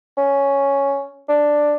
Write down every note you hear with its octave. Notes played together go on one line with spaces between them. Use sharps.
C#4
D4